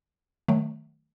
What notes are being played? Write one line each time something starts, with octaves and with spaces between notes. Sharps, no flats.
D#3 F#3 A3